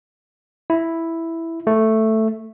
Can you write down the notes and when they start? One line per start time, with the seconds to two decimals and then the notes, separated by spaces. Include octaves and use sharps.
0.70 E4
1.67 A3